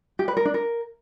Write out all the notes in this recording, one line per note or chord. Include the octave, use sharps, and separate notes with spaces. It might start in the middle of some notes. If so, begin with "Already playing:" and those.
G4
B4
A#4
D4
A#4